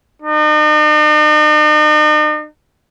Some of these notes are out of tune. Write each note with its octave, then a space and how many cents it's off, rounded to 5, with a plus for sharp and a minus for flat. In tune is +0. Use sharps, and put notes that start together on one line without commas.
D#4 -45